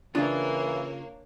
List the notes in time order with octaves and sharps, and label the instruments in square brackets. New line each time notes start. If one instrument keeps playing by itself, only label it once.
[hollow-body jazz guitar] C#3 F4 [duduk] E3 [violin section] A#3 C#5 [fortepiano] D4